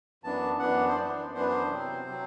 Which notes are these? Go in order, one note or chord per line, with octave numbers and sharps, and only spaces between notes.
F#2 E3 B3 D4 A5
F#2 E3 B3 D4 F#5
C5
F#2 E3 B3 D4 D5
F#2 E3 B3 D4 C5
B4
C5
C3 F#3 C4
C3 F#3 C4